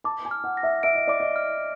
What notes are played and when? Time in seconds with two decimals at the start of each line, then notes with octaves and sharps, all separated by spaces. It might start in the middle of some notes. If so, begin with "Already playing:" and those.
0.04 A5 D6
0.25 G#5
0.31 F6
0.44 F#5
0.57 A#6
0.63 E5
0.83 E5 D7
0.95 D#5
1.07 D5 D6
1.20 D#5
1.36 F6